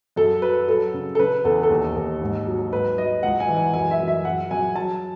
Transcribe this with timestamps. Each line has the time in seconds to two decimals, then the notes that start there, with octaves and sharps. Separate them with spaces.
0.16 F#2 A4
0.42 F#3 B4
0.68 F#3 A4
0.94 C#3
1.15 A4
1.18 C#3 B4
1.44 E2 A4
1.63 A4
1.70 D#2
1.96 D#2
2.22 G#2
2.47 F#3
2.72 G#2 B4
2.97 F#3 D#5
3.23 C#2 F#5
3.40 G#5
3.48 E3
3.57 G#5
3.74 F#2 G#5
3.91 E5
4.00 F#2
4.08 E5
4.25 F#2 F#5
4.51 F#2 G#5
4.76 F#3 A5